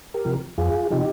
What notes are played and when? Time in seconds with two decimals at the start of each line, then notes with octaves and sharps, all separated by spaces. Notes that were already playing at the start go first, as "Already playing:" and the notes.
0.14 G4 A#4
0.25 C3 F3
0.58 F2 F4 G#4
0.90 C3 F3 D#4 G4